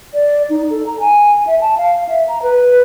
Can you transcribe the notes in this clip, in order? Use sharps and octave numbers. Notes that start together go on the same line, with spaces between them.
D5
D#4
A4
A#5
G#5
E5
A5
F5
E5
A#5
B4